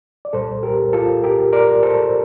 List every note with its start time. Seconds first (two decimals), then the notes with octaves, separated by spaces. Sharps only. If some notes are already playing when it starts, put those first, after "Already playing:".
0.25 D5
0.33 C2 A#2 G3 A4 C5
0.63 G4 A#4
0.93 F4 A4
1.24 G4 A#4
1.53 A#4 D5
1.83 A4 C5